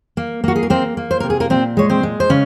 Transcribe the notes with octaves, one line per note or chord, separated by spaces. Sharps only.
A#3
A#3 F#4
G#4
A#4
A#3 C4 C5
A#3
C5
C3 A#4
G#4
A#3 A#4
A#2 C4 C5
G#3 C#5
C4 C5
G#3
C5
C#3 C#4